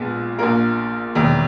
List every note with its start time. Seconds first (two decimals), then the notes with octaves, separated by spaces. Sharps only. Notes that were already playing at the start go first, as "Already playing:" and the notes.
Already playing: A#1 A#2 G#3 B3
0.38 A#1 A#2 A#3 A#4
1.15 E1 E2 D#3